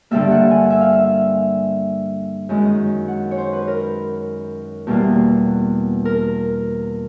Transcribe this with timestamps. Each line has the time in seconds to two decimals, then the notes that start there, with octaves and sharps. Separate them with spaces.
0.11 G2 D3 G3 A#3 E5
0.31 F#5
0.51 G#5
0.70 E5
0.81 F5
0.93 E5
2.49 F#2 D#3 G#3
3.08 F#5
3.31 C#5
3.38 C5
3.53 B4
3.68 A#4
4.87 E2 B2 G3 A#3
6.05 A#4